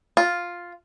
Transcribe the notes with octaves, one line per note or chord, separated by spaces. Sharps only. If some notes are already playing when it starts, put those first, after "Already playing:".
F4